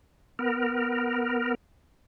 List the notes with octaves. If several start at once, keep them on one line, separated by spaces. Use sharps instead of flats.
B3 A#4